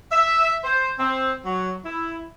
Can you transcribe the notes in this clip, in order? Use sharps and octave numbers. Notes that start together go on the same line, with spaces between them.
E5
C5
C4
F#3
E4